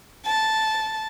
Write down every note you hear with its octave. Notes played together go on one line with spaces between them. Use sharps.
A5